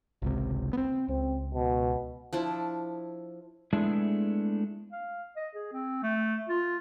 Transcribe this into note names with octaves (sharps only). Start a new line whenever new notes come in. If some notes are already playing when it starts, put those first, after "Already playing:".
G#1 C#2 C3
B3 C4
C#2 C4
B2
F3 D4 E4
G#3 A3 B3 D4 E4 G#4
F5
D#5
G#4
C4
A3
F4